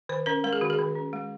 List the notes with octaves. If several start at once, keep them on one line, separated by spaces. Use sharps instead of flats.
D#3 C5
C#4 A#4
G#3 A#4
G#4
D#3 F#4
G#4
D#3
C#4
G#3